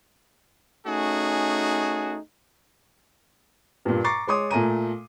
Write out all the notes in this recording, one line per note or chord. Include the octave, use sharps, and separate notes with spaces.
A3 C#4 D#4 F#4 G#4
G2 A#2
A#5 C#6 D6 A6 C7
G#3 C#5 C6 D6 D#6
A#2 A3 G#5 A#5 D#7